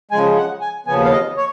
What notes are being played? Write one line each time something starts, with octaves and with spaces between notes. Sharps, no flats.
C#3 F3 G#3 G#5
F#5
G#5
D#2 C#3 F3 B3 G#5
F5
D#5
C#5